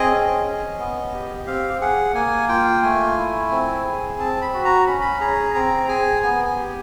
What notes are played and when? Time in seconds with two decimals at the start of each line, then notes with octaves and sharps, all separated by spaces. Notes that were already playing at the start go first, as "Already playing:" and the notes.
Already playing: C4 G#4 D#5
0.11 C#4
0.45 C#4
0.79 B3
1.14 G4
1.47 C4 F5
1.81 G#4 F#5
2.15 A#3 G#5
2.49 F4 G5
2.83 A3 G#5
3.17 E4
3.52 C4
3.85 G#4
4.19 C4 A5
4.41 B5
4.53 F#4
4.65 A#5
4.87 C#4 B5
5.01 B5
5.21 G#4 A#5
5.54 C4 A#5
5.89 G#4 G#5
6.23 B3 G#5
6.45 G#5
6.57 G4